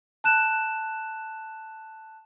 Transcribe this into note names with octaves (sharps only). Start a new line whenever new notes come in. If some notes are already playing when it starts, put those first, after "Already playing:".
A5 F#6 E7